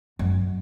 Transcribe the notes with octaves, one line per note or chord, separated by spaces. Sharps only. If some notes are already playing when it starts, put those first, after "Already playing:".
F#2